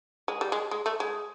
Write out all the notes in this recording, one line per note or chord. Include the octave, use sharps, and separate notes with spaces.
G#3
G3
G#3
G#3
A3
G#3